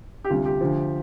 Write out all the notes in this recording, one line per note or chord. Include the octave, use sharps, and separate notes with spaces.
G4
D2 C3 G3 F4
G4
D2 D3 F3